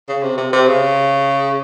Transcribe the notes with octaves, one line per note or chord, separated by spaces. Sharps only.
C#3
C3
C3
C3
C#3